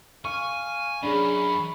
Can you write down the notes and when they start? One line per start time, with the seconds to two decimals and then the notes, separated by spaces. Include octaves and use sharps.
0.25 F5 G#5 C#6
1.03 F#2 C#4 D4 G#4 B5